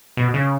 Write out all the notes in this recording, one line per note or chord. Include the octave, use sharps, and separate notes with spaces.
B2
C#3